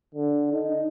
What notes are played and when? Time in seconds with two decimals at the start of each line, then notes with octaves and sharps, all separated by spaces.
0.14 D3
0.53 D#4